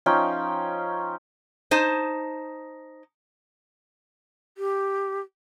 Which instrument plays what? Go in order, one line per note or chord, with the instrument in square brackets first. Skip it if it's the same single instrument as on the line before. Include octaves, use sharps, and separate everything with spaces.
[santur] F3 C#4 D#4 G5
[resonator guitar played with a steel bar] D#4 C5 A5
[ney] G4